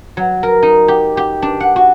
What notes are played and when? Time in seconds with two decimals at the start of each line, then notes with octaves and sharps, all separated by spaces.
0.17 F#3
0.43 A#4
0.62 D#4
0.88 G4
1.17 G4
1.42 D4
1.60 F#5
1.76 F#4